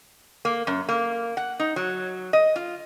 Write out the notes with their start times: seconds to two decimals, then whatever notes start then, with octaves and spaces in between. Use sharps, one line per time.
0.45 A#3
0.67 F#2
0.89 A#3
1.37 F#5
1.60 D#4
1.76 F#3
2.33 D#5
2.56 F4